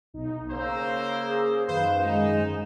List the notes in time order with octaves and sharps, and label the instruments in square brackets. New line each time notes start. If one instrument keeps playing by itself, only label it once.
[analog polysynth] B1 D#4
[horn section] C#3 A#3 C5 [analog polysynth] A#5 E6
[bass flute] G#4
[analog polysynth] F#2 D#3 E7 [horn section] B4 C5 [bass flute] F5
[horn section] G#2 D#4 [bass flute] G#3